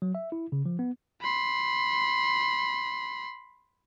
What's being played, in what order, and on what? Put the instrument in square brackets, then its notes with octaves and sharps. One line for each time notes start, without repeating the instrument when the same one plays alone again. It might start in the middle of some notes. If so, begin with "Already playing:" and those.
[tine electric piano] F#3
E5
E4
C#3
F3
B3
[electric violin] B5 C6